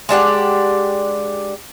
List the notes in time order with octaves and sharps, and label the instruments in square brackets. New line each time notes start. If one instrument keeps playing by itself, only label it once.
[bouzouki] G#3 D4 G4 F#5